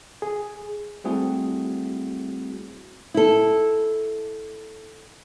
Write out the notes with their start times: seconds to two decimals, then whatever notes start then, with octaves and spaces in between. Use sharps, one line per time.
0.22 G#4
1.04 G3 A3 C4 E4 F#4 G#4
3.14 E4 A4